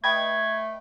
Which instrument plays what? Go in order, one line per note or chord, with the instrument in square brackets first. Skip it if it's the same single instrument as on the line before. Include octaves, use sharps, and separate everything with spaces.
[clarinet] A3 [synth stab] B4 D#5 G5 [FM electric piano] G#6